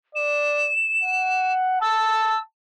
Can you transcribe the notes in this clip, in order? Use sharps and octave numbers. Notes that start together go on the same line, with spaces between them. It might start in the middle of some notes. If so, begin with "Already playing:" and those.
D5 E7
F#5
A5 E6